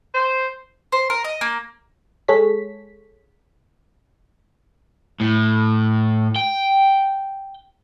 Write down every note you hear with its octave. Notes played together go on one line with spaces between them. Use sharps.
C5
C5
A#4
D#5
A#3
G#3 G#4 A4 C#5 B6
A2
G5